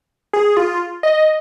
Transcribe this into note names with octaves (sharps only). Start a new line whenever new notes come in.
G#4
F4
D#5